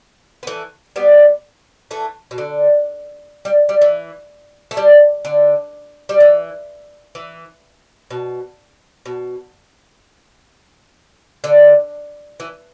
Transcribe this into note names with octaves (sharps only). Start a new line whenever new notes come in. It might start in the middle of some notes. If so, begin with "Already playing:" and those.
B3
E3 A3
G3 B3
E3 A3
B2
D3
G3
G3
E3
A3
G3
D3
G3
E3
E3
B2
B2
D3
E3